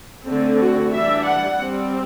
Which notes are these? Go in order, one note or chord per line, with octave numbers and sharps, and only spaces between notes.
D3 A3 C4
F#4
E3 G3 D4 E5
F#5
G3 C4